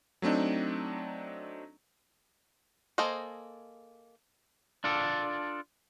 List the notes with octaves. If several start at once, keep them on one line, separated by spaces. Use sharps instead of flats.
F#3 A3 C4 D4 D#4
A#3 G#4 A4 C5 D#5
D4 F4 A4 D5